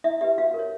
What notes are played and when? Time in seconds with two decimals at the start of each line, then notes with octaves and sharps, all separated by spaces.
0.04 E4 E5
0.21 G4 B4 E5
0.38 F#4 F5
0.54 A#4 C#5